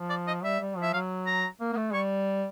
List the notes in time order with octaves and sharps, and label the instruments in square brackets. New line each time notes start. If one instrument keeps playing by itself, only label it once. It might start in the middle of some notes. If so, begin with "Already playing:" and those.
Already playing: [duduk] F3
[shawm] D5
D#5
[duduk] G3 [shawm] E5
[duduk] G3
F3
[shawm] E5
[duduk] F#3 [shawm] F5
[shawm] A#5
[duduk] A#3
A#3
A3
[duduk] G3 [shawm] C#6